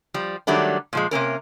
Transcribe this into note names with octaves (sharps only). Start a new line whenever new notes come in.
F3 G3
D#3 F#3 G3 A3 D4
A#2 F3 G#3
C3 A#3 C#4 A#4